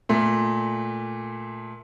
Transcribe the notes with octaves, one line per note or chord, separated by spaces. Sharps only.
A#2 A3